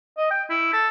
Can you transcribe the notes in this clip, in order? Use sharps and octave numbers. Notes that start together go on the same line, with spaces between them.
D#5
G5
E4
A4